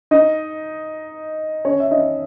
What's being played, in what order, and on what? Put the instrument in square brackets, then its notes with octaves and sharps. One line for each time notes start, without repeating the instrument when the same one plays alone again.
[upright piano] D#4 D#5
C#4 C#5
E5
D#4 D#5